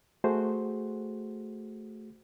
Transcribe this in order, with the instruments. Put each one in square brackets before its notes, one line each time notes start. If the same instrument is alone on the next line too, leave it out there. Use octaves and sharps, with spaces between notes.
[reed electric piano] A3 F#4 G#4 C5